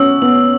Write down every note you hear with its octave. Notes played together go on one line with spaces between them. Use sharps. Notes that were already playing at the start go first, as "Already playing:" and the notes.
Already playing: B3 C#4 E6
B3 F#7